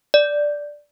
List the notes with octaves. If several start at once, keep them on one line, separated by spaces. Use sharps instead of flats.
D5